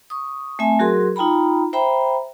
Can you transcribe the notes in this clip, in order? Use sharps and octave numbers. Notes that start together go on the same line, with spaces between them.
C#6 D#6
A3 C4 E5 G#5
F#3 F#4 G#4 A#4 C6
D#4 F4 G5 A#5 B5
C5 E5 G5 A#5 B5